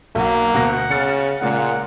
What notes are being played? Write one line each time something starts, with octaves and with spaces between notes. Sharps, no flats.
B1 A#3 F#4
D2 B2 F#5 A#6
C#3 F6 A6 C#7
A#2 C#3 G#3 A#3 F#5